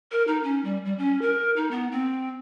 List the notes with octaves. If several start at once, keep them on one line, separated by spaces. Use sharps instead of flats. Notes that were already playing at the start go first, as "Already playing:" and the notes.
A#4
D#4
C#4
G3
G3
C#4
A#4
D#4
B3
C4